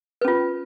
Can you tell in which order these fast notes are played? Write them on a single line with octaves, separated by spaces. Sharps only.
B4 C#4 F4